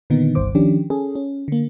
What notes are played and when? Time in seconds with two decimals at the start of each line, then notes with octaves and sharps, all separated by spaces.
0.10 A#2 D3 D#3 B3 D#4
0.35 G1 C2 G2 C5 D6
0.55 D#3 F3 C#4 D4 G4
0.90 C#4 G#4 A4
1.15 C#4
1.48 D3 A#3